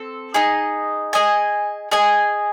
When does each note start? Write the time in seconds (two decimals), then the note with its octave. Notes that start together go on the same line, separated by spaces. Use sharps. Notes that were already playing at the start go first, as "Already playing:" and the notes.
Already playing: C4 A4
0.34 D#4 G#4 D#5
1.13 G#4 D#5 G#5
1.91 G#4 D#5 G#5